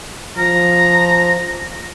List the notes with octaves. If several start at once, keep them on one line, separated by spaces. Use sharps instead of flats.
F3 A#5